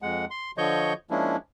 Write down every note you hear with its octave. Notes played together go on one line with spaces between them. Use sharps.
F2 G#3 F#5
C6
D3 F3 C#5 D#5 C#6 G6
F3 G#3 A#3 C#4 D4 E4